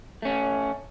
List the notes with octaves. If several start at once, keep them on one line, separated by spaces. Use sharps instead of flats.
A3 C#4